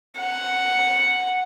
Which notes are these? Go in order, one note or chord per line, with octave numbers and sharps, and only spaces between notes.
F#5